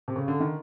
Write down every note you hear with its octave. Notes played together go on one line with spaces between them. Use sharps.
C3
C#3
D3
D#3